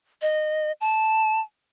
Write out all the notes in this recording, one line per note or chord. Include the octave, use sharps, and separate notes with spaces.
D#5
A5